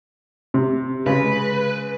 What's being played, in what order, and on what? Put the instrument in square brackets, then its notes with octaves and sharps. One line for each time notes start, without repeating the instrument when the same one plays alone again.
[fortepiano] C3
[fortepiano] C#3 G#3 [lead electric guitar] B4